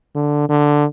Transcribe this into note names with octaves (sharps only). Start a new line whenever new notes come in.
D3
D3